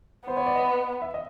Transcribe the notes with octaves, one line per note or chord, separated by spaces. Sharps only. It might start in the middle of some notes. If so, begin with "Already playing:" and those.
B3 C5
C#5
D5
D#5
E5
D#5